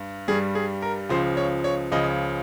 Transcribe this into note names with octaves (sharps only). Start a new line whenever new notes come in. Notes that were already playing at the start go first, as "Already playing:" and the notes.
Already playing: G2
G2 G3 G#4
G#4
A#4
C#2 C#3 F3 C5
C#5
C#5
C#2 C#3 F3 D#5